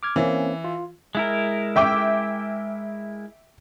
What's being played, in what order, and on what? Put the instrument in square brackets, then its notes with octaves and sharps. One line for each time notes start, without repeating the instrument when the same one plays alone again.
[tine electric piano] D6 F6 G#6
[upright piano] E3 [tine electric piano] A#3 C4 C#4
[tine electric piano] F4
[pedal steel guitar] G#3 E4 A#4
[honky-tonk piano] E5 G5 D6